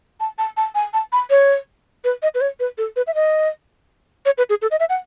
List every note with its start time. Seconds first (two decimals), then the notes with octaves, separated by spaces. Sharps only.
0.20 A5
0.38 A5
0.57 A5
0.75 G#5
0.94 A5
1.12 B5
1.30 C#5
2.04 B4
2.23 D#5
2.35 B4
2.41 C#5
2.60 B4
2.78 A4
2.96 B4
3.07 E5
3.15 D#5
4.26 C#5
4.38 B4
4.50 G#4
4.62 A4
4.71 D#5
4.80 E5
4.89 F#5